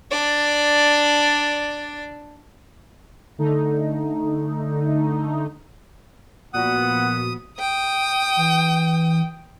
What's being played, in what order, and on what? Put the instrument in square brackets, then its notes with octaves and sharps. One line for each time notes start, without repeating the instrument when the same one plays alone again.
[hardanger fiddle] D4 D5
[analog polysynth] D3 A3 D#4
[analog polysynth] A#2 F#4 [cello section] F3 B3 [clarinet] F#5 [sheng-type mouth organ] D#6
[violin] G5 D#6
[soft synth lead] E3